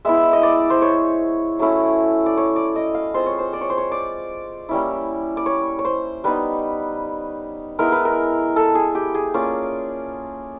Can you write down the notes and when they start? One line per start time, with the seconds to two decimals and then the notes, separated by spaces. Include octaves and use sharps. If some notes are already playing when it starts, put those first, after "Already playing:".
0.05 G#3 B3 E4 E5
0.33 D#5
0.43 D5
0.70 C5
0.82 C#5
1.59 F#3 A3 C#4 E4
2.26 D5
2.37 C#5
2.56 D5
2.76 D#5
2.94 F5
3.14 G#3 C4 F4 C5
3.26 C#5
3.39 C5
3.53 D5
3.61 C#5
3.70 C5
3.78 C#5
3.92 D5
4.69 G3 A#3 C#4 E4
5.37 D5
5.46 C#5
5.79 C#5
5.85 C5
6.24 G3 B3 D#4 B4
7.79 G#3 B3 E4 A#4
7.92 B4
8.05 A#4
8.56 A4
8.75 G#4
8.95 G4
9.15 G#4
9.34 A#3 C#4 F4 D5